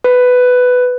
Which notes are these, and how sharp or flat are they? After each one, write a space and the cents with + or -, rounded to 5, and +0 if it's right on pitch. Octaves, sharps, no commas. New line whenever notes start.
B4 +10